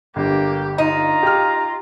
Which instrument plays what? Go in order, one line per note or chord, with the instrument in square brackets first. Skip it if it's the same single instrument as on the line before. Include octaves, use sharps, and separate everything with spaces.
[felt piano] G1 [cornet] A#3 [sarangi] G4
[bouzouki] D#4 [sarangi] F4 [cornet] A#5
[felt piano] G4 F6